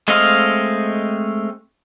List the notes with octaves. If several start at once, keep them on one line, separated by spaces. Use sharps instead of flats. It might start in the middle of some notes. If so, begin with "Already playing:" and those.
G#3 A3 C4 D#5 F5